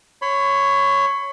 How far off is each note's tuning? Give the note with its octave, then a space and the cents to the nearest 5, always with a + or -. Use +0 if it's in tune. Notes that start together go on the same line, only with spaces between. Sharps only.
C#5 +0 B5 +40